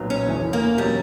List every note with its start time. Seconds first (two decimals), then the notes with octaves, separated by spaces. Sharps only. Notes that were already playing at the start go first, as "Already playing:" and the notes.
Already playing: B1 A#2 F#3 B3
0.10 C#4
0.27 F#1 E2 D3
0.53 A#3
0.78 B2 F#3 G3 C#4